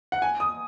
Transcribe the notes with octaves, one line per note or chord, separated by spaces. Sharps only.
F#5
G#5
D#6